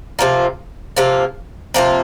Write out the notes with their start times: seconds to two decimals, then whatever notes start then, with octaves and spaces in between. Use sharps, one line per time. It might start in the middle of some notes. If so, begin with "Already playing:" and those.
0.19 C3 F3 A#3 F4
0.97 C3 F3 A#3 F4
1.74 C3 F3 A#3 F4